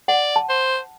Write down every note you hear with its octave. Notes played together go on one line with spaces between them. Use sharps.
D5 F#5
A5
C5